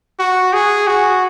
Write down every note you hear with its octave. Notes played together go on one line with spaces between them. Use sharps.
F#4
G#4
F#4